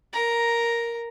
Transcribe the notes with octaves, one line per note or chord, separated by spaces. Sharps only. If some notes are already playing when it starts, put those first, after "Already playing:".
A#4 A#5